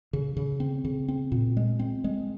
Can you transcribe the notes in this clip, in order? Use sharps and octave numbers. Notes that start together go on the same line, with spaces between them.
C#3
C#3
C4
C#3
C4
A#2
G#3
C4
G#3